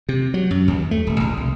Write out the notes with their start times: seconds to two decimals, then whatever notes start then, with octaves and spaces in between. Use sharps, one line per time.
0.09 C3
0.34 F#3
0.51 F#2
0.68 D#2
0.91 A3
1.07 D#1
1.20 A#1
1.37 C2